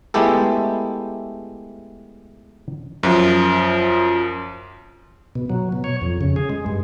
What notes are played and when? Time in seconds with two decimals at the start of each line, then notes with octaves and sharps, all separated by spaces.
0.14 G#3 A3 B3 E4 G4 A4
3.03 F#2 F3
5.36 B2
5.50 F#3
5.72 B2
5.84 C#5
6.02 F2
6.21 C#3
6.36 G#4
6.50 G#3
6.66 G2